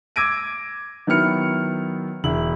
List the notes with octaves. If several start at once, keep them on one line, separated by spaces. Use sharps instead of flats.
D6 E6 G#6 A#6 D7 D#7
D#3 F#3 B3 E4 F6 C#7
E1 E4 F#7